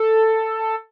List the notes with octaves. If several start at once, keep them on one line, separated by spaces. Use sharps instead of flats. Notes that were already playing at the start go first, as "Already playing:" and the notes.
Already playing: A4